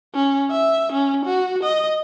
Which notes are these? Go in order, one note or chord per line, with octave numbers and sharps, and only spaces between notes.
C#4
E5
C#4
F#4
D#5